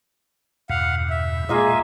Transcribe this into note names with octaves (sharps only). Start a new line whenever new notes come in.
E2 G2 B2 F5 F#5
E5
A#2 G#3 A#3 F4 G#4 D#5